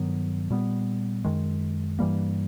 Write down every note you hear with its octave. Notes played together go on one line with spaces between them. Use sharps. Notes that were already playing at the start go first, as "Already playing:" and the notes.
Already playing: G2 D#3 F#3 B3
A#2 G3 B3
F#2 D#3 G#3
G2 E3 G3 A#3